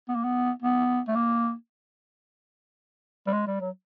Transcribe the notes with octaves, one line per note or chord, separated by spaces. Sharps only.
B3
A#3
B3
B3
A3
A#3
G3
G#3
G3
F#3